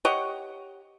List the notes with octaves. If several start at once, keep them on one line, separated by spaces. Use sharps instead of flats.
G4 C#5 D#5 F#5